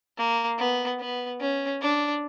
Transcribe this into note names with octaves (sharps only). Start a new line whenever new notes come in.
A#3
B3
B3
C#4
D4